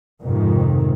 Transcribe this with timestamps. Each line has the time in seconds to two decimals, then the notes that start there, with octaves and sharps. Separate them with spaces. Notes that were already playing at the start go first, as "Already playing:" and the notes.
0.23 F2 G#2 C3 D#3